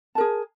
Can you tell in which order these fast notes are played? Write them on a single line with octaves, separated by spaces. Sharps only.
A5 A#4 G#4